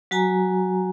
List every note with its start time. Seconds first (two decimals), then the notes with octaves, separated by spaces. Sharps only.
0.11 F#3 F#4 G#5 A#5